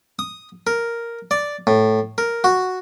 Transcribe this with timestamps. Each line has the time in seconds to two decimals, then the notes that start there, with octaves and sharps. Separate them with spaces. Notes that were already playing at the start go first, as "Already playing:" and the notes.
0.19 D#6
0.67 A#4
1.31 D5
1.67 A2
2.18 A#4
2.44 F#4